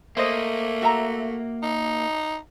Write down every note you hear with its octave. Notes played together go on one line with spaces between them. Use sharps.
A3 A#3 C5 D#5
F#4 E5 A#5
D#4